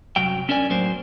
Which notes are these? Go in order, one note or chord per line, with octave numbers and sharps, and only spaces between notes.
C2 F#2 F#3 G5
C#4 D4 A#4 D5 G#5
A2 F#3 A#3 C5